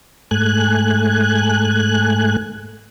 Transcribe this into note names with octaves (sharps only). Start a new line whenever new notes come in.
G#2 A3 G#5 F#6